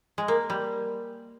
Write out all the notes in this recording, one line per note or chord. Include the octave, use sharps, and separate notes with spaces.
G#3
A#3
G3